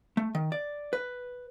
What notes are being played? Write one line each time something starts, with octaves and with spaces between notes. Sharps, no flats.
A3
D#3
D5
B4